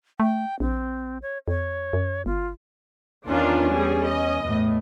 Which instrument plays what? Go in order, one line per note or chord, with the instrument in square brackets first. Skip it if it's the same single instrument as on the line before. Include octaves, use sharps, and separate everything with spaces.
[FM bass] A3 [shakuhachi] G5
[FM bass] A#1 [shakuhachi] C4
[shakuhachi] C#5
[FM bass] F2 [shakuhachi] C#5
[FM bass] F#2
[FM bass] G1 [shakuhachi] F4
[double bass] E2 C#4 [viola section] D#3 D4 F4
[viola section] G3 G#4
D#5
[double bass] E2 A2